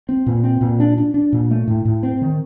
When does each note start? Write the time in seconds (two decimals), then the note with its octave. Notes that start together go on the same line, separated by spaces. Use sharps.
0.09 C4
0.26 A#2
0.43 C4
0.61 A#2
0.80 D4
0.98 D4
1.14 D4
1.32 A#2
1.51 A3
1.67 A2
1.85 A2
2.03 C4
2.21 D#3